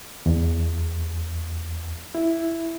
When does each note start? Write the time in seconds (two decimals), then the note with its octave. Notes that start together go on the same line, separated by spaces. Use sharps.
0.26 E2
2.15 E4